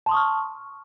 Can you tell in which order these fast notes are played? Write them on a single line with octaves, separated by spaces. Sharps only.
A5 C6 D#6 C#6 F6